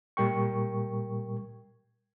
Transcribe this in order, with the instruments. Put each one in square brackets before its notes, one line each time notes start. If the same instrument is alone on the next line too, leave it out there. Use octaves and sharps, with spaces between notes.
[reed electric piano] A#2 G3 A#4 G5 C#6